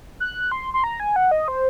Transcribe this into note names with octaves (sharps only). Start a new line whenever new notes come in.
F#6
C6
C6
A#5
G#5
F#5
D#5
C5